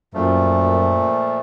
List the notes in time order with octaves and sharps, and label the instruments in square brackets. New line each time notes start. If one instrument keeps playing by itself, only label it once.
[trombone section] F#2 [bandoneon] A#2 F3 A3